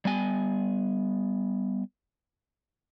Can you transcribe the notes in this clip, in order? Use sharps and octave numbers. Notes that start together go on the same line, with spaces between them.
G3 B3 G#5